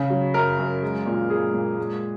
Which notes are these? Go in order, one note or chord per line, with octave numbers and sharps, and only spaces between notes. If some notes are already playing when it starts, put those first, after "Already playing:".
Already playing: C#3
F#3
F#2 A#4
F#2
G#3
A#2
G#3 G#4
A#2
G#3